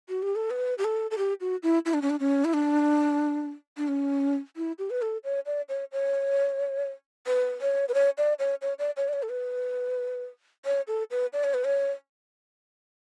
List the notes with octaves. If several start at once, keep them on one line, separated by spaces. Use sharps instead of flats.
F#4
G4
A4
B4
G4
A4
A4
G4
F#4
E4
E4
D4
C#4
D4
C#4
E4
D4
D4
C#4
E4
G4
B4
A4
C#5
D5
C#5
C#5
B4
C#5
B4
C#5
D5
C#5
C#5
D5
C#5
D5
C#5
A4
B4
C#5
A4
B4
D5
C#5
B4
C#5